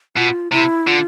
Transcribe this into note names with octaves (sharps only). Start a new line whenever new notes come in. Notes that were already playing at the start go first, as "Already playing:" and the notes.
B2 F4
C3 E4
D3 F4